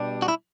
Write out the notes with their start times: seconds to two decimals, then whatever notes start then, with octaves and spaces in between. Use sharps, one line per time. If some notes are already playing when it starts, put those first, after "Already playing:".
Already playing: B2 G3 D4
0.22 F#4
0.28 E4